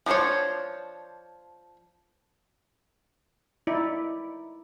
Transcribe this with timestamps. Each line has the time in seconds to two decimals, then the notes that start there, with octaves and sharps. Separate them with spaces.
0.06 F3 D4 D#4 C5 C#5
3.67 D#4 E4 D5